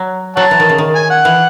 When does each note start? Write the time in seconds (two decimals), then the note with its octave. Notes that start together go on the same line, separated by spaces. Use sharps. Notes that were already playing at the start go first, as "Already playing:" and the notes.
Already playing: F#3
0.36 F#3 C#5 F#5 A5
0.51 E3
0.60 D#3
0.69 C#3
0.78 D#3
0.96 G#5
1.10 F#5
1.25 E3